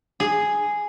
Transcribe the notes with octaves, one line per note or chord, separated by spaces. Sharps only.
G#4